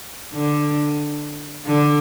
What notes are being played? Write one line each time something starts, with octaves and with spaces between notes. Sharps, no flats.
D3
D3